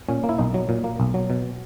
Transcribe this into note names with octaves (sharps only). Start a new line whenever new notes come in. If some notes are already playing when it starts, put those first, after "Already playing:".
A#2 C#4
A#3
E4
B1 D#4
F#3
A#2
A#3
B1
F#3
B2